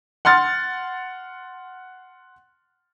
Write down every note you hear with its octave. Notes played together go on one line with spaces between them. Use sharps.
F#5 C6 F6 A6